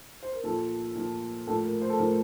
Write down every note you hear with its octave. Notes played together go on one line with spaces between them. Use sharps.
C5
A#4
A#2 F3 A4
A#2 F3
A2 F3 A4
A#4
C5
A4
A2 F3 A#4